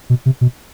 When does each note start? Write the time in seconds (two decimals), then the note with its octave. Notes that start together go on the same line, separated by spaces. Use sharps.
0.10 B2
0.26 C3
0.41 B2